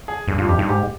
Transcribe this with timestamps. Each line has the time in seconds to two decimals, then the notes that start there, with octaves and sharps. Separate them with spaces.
0.08 G#4
0.28 G2
0.38 G2 F4
0.48 F2 G4
0.58 G2 D#4
0.69 G#2 G4